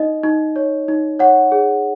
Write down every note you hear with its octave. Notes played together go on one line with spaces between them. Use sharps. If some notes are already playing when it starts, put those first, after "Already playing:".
Already playing: D#4 D#5
D#4
C#5
D#4
C#5 F#5
G#4